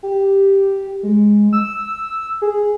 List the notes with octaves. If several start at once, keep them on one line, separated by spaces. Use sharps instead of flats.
G4
G#3
E6
G#4